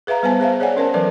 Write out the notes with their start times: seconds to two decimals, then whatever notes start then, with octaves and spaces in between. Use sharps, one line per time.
0.07 G#4 B4 E5 F5 A#5
0.23 G3 B3 B4 C5 G#5 A5
0.40 G#4 C5 E5 F5
0.60 G#4 C#5 D5 F#5 G#5
0.77 C#4 A#4 C5 A5
0.94 E3 F#3 A4 B4 D5